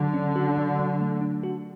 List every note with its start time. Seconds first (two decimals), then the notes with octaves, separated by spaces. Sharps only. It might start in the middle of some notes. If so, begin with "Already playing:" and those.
Already playing: D3 F#3
0.14 C#4
0.36 F#4
0.58 F#3
0.79 F#3
1.01 A3
1.21 D4
1.43 F#4